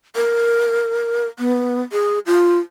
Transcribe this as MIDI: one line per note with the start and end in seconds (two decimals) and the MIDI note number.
0.16 1.25 70
1.39 1.82 59
1.92 2.19 68
2.26 2.59 65